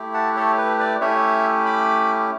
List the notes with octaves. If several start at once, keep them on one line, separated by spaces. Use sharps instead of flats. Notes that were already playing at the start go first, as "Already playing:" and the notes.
Already playing: A3 E4 G4
F#5 A5
A4 C#5
B4
B4 D5
A3 C#4 E4 G4 C#5 E5
B5 D6